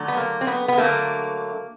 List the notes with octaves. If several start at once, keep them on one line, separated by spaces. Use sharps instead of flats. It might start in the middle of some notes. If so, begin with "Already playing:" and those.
Already playing: D3 F#3 A3
B3
A#3
C4
B3
B3
D3 F#3 A3 A#3